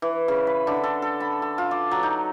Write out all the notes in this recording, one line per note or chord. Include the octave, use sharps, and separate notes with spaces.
E3
C#3
B5
D3
A4
A4
B5
A4
F4
D6
F#3
D#4